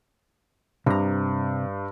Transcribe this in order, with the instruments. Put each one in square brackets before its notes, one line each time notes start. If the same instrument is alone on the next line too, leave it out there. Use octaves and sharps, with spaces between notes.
[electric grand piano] G2 [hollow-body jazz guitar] C3 A#5